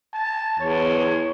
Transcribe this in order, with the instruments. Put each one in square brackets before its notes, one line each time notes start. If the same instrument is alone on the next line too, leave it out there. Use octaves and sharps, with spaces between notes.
[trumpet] A5
[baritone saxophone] E2 [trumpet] C#5